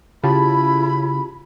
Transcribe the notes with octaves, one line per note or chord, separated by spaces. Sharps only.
C#3 E4 F4 G4 A5 B5